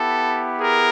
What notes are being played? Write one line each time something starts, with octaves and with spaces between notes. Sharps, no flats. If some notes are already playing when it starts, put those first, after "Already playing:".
Already playing: B3 E4 G4 A4
G#4 A#4